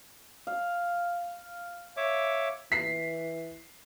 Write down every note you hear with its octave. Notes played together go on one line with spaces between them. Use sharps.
F5
C#5 E5 D6
E3 B6 C7